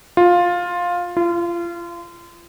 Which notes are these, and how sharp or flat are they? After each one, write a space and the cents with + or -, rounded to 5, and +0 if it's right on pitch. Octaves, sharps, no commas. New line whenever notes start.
F4 +10
F4 -30